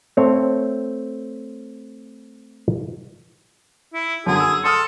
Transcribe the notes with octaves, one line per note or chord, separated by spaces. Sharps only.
A3 C4 C#5
E4
F#2 D3 F#3 G#4
E6
A4 C6 D#6 F6